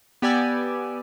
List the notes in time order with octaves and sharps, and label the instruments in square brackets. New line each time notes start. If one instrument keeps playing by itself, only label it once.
[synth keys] B3 G4 D5 G#5 E6